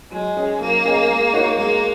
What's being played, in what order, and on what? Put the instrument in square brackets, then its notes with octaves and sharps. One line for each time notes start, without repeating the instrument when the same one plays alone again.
[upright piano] F#3 [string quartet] G#3
[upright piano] C#4 G#4 D#5
[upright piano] F#3 [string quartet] A#3
[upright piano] C#4 G#4 D#5
G#3
D#4 F#4 C#5
[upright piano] G#3 [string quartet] A#3